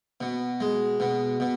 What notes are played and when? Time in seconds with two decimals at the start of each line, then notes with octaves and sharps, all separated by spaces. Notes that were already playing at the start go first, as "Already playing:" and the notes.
0.20 B2
0.60 G#3
1.00 B2
1.40 B2